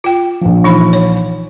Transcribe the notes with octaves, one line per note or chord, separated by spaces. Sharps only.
F4 G5
A#1 F3
E3 D#4 B5
C#5